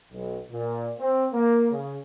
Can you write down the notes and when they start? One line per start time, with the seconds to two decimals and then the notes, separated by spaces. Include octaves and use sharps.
0.12 B1
0.49 A#2
0.99 C4
1.32 A#3
1.71 C#3